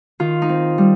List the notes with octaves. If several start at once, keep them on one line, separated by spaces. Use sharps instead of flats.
D#3 F4
D#4
C4
G3